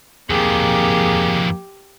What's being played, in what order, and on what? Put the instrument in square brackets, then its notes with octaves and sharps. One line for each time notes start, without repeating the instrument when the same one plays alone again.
[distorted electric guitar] F2 D#3 [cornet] A#3 [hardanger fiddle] G4 [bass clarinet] G#4